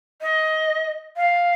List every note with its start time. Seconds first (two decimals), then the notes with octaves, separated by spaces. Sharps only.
0.22 D#5
1.17 F5